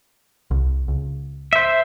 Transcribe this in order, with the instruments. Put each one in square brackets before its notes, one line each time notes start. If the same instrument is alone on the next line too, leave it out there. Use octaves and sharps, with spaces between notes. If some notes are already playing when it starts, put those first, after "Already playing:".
[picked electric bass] C2
C#2
[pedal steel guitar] C5 E5